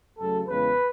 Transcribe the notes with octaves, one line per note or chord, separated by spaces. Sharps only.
F#2 C#3 F#3 A3 A4
E2 C#3 E3 G#3 B4